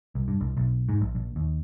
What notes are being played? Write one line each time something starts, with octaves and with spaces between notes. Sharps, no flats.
C2
G2
C2
B1
G#2
A#1
A#1
D#2